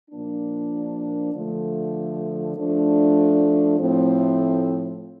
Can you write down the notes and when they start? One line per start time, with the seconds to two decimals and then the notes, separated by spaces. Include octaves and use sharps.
0.11 A#2 F3 A#3 D4
1.33 D3 F3 A3
2.56 F3 A3 D4
3.79 A2 F3 A3 C4